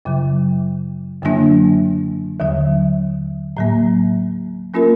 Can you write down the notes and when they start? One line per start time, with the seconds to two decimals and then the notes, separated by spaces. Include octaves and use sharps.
0.05 F#2 C#3 F#3
1.23 F#2 D3 F#3 A#3 D4
2.40 D#2 D3 F#3
3.57 A2 F#3 A#3
4.74 F#3 A#3 C#4 F4 A#4